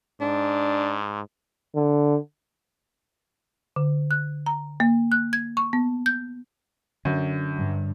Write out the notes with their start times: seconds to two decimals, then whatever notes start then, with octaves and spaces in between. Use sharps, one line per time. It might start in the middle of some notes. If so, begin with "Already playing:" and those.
0.21 G#2 D4
1.76 D3
3.76 D3
4.11 F#6
4.46 A#5
4.80 A#3
5.12 F#6
5.33 G#6
5.57 C#6
5.73 B3
6.06 G6
7.05 F#2 D3
7.56 G2